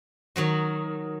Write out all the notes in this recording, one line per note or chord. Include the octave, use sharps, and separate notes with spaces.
D#3 F#3 F#4